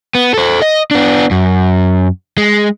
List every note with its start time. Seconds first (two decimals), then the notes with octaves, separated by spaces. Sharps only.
0.15 B3
0.34 A4 C5
0.62 D#5
0.91 B3 D4
1.31 F#2
2.38 G#3